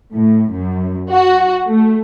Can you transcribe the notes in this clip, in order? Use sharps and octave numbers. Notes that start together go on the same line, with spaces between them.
A2
F#2
F#4
A3